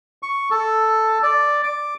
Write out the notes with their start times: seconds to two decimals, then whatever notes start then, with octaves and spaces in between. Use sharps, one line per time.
0.23 C#6
0.51 A4
1.23 D5
1.63 D6